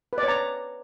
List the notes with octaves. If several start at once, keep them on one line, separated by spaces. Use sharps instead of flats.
B4
D5
C#5
A#5